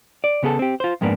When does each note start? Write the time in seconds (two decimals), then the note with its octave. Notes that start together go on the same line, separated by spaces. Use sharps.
0.24 D5
0.43 C#3 B3 G#4 A4
0.59 C4 G4
0.80 F4 C5
1.01 F2 G#2 G#3 A#3 B3 D4